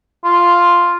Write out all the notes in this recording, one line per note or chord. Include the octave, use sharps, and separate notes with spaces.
F4